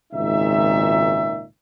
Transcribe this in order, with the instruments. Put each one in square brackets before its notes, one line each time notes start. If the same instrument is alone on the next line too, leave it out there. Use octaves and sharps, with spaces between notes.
[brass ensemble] G#1 C#2 A#2 D#4 E5